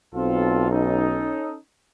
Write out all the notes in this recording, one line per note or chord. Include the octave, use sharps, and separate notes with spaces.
B1 C4 F4 A4
C#4 D#4 A4